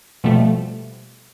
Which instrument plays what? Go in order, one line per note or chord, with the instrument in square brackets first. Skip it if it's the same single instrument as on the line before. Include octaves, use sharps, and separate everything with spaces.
[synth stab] B2 F3 G3 A3